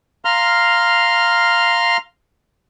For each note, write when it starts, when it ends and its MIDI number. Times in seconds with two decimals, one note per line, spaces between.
0.25 1.97 77
0.25 1.97 82
0.25 1.97 84
0.25 1.97 89